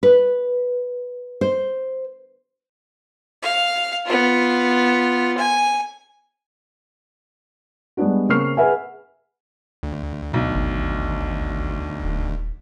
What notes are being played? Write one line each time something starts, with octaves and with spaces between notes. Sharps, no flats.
B4
C5
F5
B3 F4
G#5
G3 G#3 B3 D4 F#4
C#3 A#3 C4 C#6 F6 C7
G#4 B4 E5 F#5 G#5
D2
B1 B2
G#1
D#1